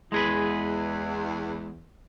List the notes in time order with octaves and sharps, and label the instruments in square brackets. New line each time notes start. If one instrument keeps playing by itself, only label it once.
[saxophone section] E2 [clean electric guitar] G#3 G#4 B4